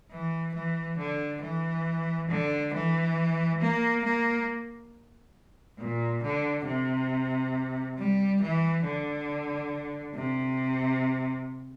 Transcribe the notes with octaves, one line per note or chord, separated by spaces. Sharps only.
E3
E3
D3
E3
D3
E3
A#3
A#3
A#2
D3
C3
G3
E3
D3
C3